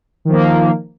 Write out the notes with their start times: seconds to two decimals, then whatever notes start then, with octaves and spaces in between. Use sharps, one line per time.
0.25 D#3
0.28 F3
0.32 A#3